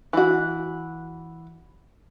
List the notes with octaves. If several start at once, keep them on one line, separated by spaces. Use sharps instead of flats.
E3 F#4